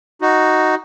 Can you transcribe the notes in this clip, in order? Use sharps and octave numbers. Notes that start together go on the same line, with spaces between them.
D#4 F#4